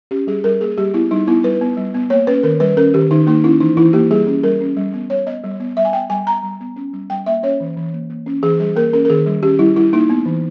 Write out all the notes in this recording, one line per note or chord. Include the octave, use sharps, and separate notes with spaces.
C#4 G4
G3 G#4
G3 A#4
A#3 G#4
G3 G4
B3 E4
G3 D#4
B3 E4
G3 B4
B3
G3
B3
A#3 C#5
C#4 B4
D#3 A#4
G3 B4
C#4 A#4
D#3 G4
D#3 D#4
A#3 D#4
C#4 E4
E3 D#4
E3 E4
A#3 G4
G3 G#4
C#4
G3 A#4
C#4
G3
B3
G3 C#5
B3 D#5
G3
B3
G3 E5
G#5
B3 G5
G3 G#5
B3 A#5
G3
B3
C#4
G3
G3 G5
A#3 E5
C#4 C#5
E3
E3
A#3
A#3
C#4
E3 G#4
G3 G#4
A#3 A#4
C#4 A#4
A#4
D#3 G#4
G3
C#4 G4
G3 E4
G3 E4
A#3 D#4
B3
E3